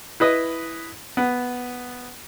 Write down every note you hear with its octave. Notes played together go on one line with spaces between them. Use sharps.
E4 B4 D#5
B3